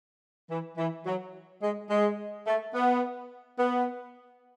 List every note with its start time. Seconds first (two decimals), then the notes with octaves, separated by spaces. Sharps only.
0.50 E3
0.78 E3
1.06 F#3
1.63 G#3
1.90 G#3
2.47 A3
2.75 B3
3.59 B3